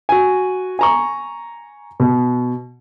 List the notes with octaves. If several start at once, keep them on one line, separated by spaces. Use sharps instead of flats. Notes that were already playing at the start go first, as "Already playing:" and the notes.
F#4 G#5
G#5 A#5 C#6
B2